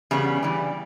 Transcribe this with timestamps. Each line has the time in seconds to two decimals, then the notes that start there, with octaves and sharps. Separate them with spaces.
0.11 E2 C#3 G3 B3
0.43 G2 E3 G3